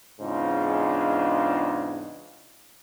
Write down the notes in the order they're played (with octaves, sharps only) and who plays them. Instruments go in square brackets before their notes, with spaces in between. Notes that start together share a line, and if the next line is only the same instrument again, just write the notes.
[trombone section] E2 G#2 C#3 D4 F4